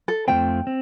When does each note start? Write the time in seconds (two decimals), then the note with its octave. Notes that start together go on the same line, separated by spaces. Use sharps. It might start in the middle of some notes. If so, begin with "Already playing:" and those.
0.08 A4
0.28 F2 F3 A3 C4 G5
0.67 C4